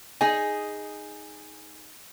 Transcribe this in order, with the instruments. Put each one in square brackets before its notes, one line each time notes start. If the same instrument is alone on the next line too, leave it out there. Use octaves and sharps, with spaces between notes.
[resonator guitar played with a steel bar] D#4 G#4 [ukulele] G#5